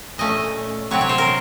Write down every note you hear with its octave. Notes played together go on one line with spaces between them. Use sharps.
A#2 A3 C#4 D#5
C3 F#3 C4 C#5
C#5
C5
A#4